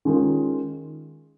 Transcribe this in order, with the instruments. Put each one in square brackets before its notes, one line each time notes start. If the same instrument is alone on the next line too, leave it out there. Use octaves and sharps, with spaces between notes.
[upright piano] D#3 G#3 C#4 F4 A#4